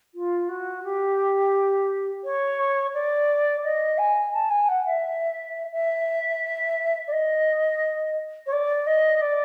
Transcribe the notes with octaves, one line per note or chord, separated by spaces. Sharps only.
F4
F#4
G4
C#5
D5
D#5
G#5
A5
G#5
F#5
E5
E5
D5
D#5
C#5
D5
D#5
D5